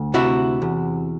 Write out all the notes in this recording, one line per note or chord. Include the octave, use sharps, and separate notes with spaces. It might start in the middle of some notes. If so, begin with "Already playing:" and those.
Already playing: D2
C3 E4 F#4
E2